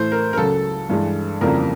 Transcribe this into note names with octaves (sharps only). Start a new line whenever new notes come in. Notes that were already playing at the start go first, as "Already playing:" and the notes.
Already playing: A2 E3 A3 C5
A#4
A#4
C#2 C#3 F#3 A4
G2 E3 G#3
F2 C#3 E3 G3 A#3 A#4